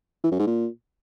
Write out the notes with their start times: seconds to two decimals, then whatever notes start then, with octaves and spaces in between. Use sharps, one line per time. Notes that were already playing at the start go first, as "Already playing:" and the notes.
0.24 E3
0.32 F#2
0.39 G#2
0.47 A#2